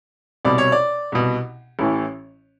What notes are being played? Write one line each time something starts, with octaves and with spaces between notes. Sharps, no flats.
C2 B2 D5
C#5
D5
C2 B2
A1 A2 E3